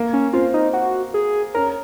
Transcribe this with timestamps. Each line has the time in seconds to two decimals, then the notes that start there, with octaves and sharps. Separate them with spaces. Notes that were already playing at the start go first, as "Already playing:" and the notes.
Already playing: A#3
0.13 C#4
0.33 C4 F4
0.54 D#4
0.73 F#4
1.14 G#4
1.54 C#4 A#4